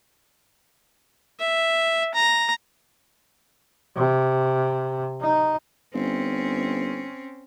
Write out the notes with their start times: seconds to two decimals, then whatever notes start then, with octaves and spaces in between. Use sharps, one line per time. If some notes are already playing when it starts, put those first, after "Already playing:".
1.40 E5
2.14 A#5
3.96 C3
5.21 D#4
5.94 G1 C4 C#4